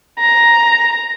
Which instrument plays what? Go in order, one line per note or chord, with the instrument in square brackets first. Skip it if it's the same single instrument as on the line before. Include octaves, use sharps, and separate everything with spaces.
[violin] A#5